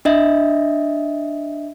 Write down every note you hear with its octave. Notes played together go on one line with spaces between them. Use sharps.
D4 D#5 E5